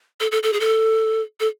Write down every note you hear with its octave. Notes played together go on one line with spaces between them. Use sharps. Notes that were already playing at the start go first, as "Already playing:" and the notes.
A4
A4
A4
G#4
A4
A4